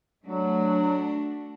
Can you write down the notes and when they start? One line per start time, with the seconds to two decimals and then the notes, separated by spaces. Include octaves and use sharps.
0.25 F#3 A3 D4 F#4